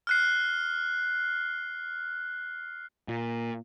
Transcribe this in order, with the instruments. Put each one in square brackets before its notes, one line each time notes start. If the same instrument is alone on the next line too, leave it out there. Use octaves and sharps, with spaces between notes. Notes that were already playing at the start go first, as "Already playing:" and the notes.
[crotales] F6 F#6 C7
[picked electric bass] A#2